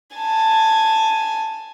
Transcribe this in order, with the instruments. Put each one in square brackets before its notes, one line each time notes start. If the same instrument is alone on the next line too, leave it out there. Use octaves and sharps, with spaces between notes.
[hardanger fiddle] G#5 A5